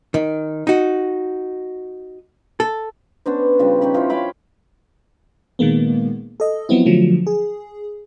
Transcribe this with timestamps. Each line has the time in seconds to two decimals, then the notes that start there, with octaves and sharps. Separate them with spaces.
0.14 D#3
0.67 D#4 F#4
2.60 A4
3.26 B3 C#4 D4 C5
3.59 C#3 F3 G3
3.81 C#4 D#4 G4 B5
3.94 F3 E4 C5
4.10 C#5 F5 G5 B5
5.59 A#2 D#3 G#3 A#3 B3
6.40 A4 D#5
6.69 F3 F#3 B3 C4 E4
6.86 D3 F3 F#3 A3
7.27 G#4